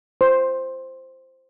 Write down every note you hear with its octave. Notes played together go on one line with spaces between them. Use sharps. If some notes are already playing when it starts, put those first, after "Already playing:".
C5